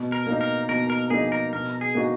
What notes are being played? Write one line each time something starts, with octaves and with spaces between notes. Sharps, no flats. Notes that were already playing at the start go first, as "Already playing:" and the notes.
Already playing: B2
A#4
A#3 D#4
A#4
B2 A#4
A#4
A#3 D#4 G#4
A#4
B2 A#4
G#4
A#3 D#4 F#4